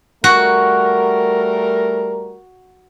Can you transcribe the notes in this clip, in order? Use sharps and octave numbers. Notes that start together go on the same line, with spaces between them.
G3 A3 F#4 A#4